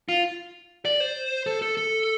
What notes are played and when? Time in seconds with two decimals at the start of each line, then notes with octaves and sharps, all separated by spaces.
0.09 F4
0.85 D5
1.00 C5
1.46 A4
1.62 A4
1.77 A4